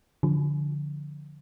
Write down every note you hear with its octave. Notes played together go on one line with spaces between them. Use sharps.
D3 F3